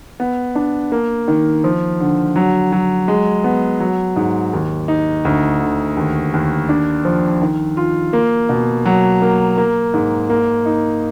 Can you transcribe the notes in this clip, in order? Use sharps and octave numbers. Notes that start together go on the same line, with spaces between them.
B3
D4
A#3
D#3
F3
D3
F#3
F#3
G#3
B3
F#3
G#2
D#2
D#4
D2
D3
D#2
D#2
D4
F3
D#3
F4
A#3
B2
F#3
A#3
A#3
G#2
A#3
D#4